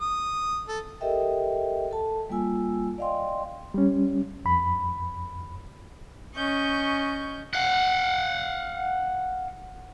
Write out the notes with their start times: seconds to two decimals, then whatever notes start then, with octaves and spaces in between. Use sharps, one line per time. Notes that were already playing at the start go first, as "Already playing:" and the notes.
0.01 D#6
0.68 A4
1.01 G4 A4 A#4 D#5 E5 G5
1.91 A4 A5
2.29 G3 A#3 F4 G#5 E6
2.98 D5 D#5 F5 G5 C6
3.74 G3 C#4
4.45 F2 B5
6.36 C#4 D#5 C#6 G6
7.53 F5 F#5